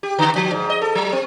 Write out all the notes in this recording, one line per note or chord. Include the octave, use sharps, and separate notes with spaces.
G4
D3
F3
G#2
D#5
A4
F#3
C4